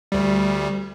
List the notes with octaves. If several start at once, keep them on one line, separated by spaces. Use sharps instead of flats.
D2 G3